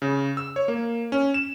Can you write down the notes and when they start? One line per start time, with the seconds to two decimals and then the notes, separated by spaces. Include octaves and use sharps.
0.02 C#3
0.37 E6
0.56 C#5
0.68 A#3
1.12 C#4
1.34 E7